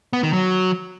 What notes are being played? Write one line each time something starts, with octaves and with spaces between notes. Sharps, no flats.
B3
D#3
F#3